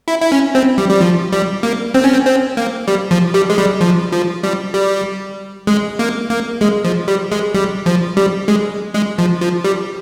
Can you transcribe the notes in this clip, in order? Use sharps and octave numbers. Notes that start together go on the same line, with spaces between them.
E4
E4
C#4
C4
G3
G3
F3
G3
A#3
C4
C#4
C4
C4
A#3
G3
F3
G3
G#3
G3
F3
F3
G3
G3
G#3
A#3
A#3
G#3
F3
G3
G#3
G3
F3
G3
G#3
G#3
F3
F3
G3